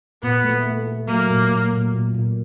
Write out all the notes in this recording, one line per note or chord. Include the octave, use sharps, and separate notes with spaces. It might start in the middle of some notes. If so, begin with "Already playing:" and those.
A#2 B3
A3
A3
A3
F#3 A#3
A#2
A#2
A#2
A#2
A#2